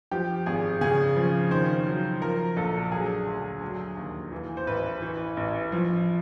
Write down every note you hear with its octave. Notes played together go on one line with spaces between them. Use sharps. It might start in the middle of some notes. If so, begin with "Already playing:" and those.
F3 G4
G#1 G#4
C#3 G#4
F3
D#3 C5
F#3
F3 A#4
A#1 A4
F#3 G#4
D2
F#3
D#2
E3
C5
A1 B4
E3
A1
F3